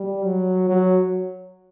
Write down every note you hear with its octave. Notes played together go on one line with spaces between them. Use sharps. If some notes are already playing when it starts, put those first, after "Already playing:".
Already playing: G3
F#3
F#3